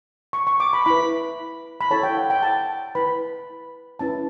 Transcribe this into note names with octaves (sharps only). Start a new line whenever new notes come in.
C#6
C#6
D6
B5
E4 B4 B5
B5
E4 A4 C#5 A5
G5
F#5
G5
A5
E4 B4 B5
C#4 E4 B4 A5